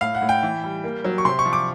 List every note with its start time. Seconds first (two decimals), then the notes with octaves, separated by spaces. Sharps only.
0.01 A2 F5
0.15 F#5
0.22 A2
0.29 G5
0.43 E3
0.64 G3
0.84 A#3
1.04 F#3
1.18 C#6
1.25 C3 C6
1.39 C#6
1.46 F3
1.53 D6